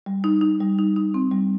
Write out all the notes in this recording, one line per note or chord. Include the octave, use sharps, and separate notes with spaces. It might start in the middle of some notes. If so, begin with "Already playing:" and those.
G3
D#4
D#4
G3
D#4
D#4
C4
G3